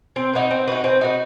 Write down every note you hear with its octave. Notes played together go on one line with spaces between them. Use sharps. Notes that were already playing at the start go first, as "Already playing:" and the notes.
C4
D#4 F#4 B4
C4
D#4 F#4 B4
C4
D#4 F#4 B4